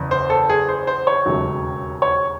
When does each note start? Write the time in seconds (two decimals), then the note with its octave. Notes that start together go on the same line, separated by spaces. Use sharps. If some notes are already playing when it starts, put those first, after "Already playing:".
Already playing: F#1 E2 C#3
0.11 C5
0.30 A4
0.49 G#4
0.69 C5
0.87 C5
1.07 C#5
1.26 E1 D#2 C#3 F#3 A3
2.02 C#5